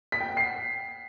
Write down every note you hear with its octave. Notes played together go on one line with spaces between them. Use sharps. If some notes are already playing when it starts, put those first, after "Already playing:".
B6
G5
F#5
C7